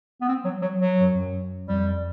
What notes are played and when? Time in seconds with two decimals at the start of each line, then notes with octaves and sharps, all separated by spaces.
0.21 B3
0.28 C4
0.44 F#3
0.62 F#3
0.79 F#3
0.98 F#2
1.67 F2 G3